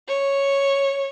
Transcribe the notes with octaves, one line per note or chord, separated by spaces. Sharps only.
C#5